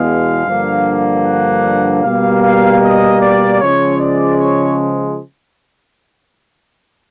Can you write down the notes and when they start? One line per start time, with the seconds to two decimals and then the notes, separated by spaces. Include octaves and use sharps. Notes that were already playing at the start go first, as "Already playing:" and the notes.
Already playing: E2 B2 G#3 F5
0.46 G2 D3 F3 A#3
1.25 F#5
2.03 B2 G3 A#3 F5
2.43 F5
2.82 D#5
3.21 D5
3.60 C#3 F3 G#3 C#5
4.00 D5
4.39 C#5